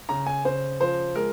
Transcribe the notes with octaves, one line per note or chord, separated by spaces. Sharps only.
C#3 A#5
G#5
C#3 C5
F3 C5
G#3 A#4